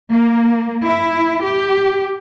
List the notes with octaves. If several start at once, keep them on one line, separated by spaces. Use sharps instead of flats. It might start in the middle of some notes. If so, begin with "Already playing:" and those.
A#3
E4
G4